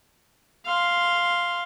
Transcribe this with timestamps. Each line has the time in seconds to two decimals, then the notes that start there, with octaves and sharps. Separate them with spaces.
0.66 F5 C6